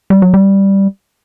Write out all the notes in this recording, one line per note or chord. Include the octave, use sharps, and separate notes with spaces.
G3
F#3
G3